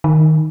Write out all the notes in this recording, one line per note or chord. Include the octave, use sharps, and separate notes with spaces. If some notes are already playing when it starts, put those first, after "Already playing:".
D#3